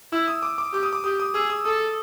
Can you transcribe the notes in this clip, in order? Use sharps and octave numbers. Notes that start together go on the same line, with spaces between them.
E4 E6
D#6
D6
D6
G4 D6
D#6
D6
G4 D#6
D#6
G#4 E6
D#6
A4 D#6